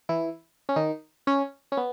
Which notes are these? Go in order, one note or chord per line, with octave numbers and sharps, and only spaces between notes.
E3 E4
C#4
D#3 D#4
C#4
C#4
B3